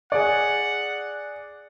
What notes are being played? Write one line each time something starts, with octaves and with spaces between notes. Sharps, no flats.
G#4 D5 F#5